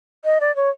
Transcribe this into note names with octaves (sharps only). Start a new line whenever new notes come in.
D#5
D5
C#5